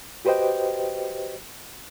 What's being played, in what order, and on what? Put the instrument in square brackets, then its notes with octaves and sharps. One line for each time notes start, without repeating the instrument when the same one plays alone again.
[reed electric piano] F#4 G4 B4 C5 D#5 G5